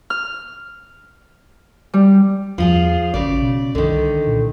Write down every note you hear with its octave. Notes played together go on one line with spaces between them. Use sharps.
F6
G3
E2 F3 F4 G#4
A1 C#3 D5
B2
C2 D3 D#3
A#2